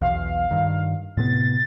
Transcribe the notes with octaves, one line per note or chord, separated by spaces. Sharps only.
B1 E2 F5
G2 D#3
A2 C3 B3 A6